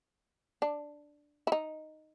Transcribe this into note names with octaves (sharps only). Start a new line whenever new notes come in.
D4
E4
D#4